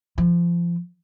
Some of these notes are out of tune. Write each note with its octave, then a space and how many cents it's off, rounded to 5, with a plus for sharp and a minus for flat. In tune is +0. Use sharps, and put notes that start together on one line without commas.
F3 -25